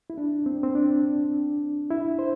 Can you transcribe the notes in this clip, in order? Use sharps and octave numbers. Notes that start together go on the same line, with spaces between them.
E4
D4
C4
C4
D4
E4
C5